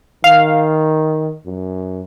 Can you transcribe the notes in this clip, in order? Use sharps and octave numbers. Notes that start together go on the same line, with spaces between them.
D#3 F5
F#2